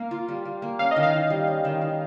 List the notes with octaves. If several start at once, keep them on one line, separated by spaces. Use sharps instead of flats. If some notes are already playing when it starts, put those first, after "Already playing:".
Already playing: A#3 F5
F4
G3
G3
A#3
C#4 F5
D#5
D#3
F5
D#3
G3
C#4
D#3
D#3